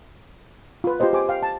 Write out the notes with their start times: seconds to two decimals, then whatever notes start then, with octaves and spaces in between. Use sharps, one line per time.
0.84 F4 B4
1.00 F4 G4 G#4 C5 D#5
1.13 G4 C5 G#5 D6
1.29 F5 G5
1.43 A5